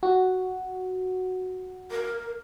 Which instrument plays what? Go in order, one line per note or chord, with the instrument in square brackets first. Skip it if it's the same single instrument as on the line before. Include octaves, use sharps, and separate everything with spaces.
[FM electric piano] F#4
[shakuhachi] A#4